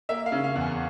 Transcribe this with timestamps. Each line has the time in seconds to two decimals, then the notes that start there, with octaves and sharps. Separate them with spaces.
0.09 A#3 E5
0.26 F5
0.32 C#3
0.44 F5
0.55 E2
0.61 G#5